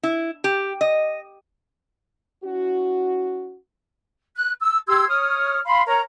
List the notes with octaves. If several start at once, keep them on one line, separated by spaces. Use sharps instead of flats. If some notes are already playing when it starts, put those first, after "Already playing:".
E4
G4
D#5
C#4 E4 F#4
F#6
E6
G4 C6 E6 G#6
C#5 D#6 F6
F5 B5 C6
A#4 C#5 A#5